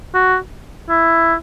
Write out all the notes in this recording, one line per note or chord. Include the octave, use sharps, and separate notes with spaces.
F#4
E4